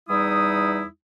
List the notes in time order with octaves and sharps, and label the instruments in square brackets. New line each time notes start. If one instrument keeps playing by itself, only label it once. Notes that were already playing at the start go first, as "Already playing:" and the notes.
[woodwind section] E2 G3 D#4 E4 D#6